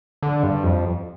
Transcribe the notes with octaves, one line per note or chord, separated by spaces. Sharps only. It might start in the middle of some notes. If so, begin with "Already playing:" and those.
D3
G2
F2